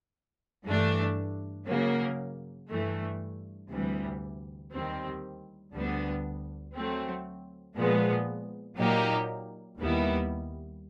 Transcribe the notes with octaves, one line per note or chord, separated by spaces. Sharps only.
G2 E3 A3 D4
C#3 F#3 A#3
G2 E3 A3
D2 C3 E3 G3
D#2 D#3 G3 C4
D2 D3 G3 B3 D4
F#3 A3 C4
A#2 F3 G#3 B3
A#2 F#3 A#3 D#4 G4
D#2 D#3 G3 B3 E4